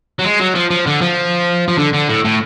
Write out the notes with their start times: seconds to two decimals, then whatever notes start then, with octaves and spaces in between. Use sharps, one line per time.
0.19 F#3
0.25 G#3
0.40 F#3
0.55 F3
0.71 F3
0.86 D3
1.01 F3
1.68 F3
1.78 D3
1.93 D3
2.09 A2
2.25 A2